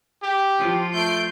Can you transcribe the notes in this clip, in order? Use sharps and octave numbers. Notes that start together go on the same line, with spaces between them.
G4
F3 F4
A3 G6 C7 D7